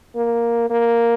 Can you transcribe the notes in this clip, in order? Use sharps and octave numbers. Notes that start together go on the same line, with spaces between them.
A#3
A#3